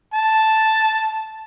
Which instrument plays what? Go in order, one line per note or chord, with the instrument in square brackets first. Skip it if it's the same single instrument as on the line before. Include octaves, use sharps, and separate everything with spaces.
[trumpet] A5